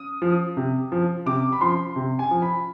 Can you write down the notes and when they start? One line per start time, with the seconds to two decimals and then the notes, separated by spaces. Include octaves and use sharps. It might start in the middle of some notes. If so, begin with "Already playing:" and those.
Already playing: D#6
0.22 F3
0.57 C3
0.92 F3
1.26 C3 D6
1.52 B5
1.61 F3 C6
1.96 C3
2.19 G#5
2.31 F3
2.42 B5